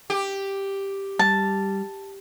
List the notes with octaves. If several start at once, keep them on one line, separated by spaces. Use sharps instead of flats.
G4
G3 A5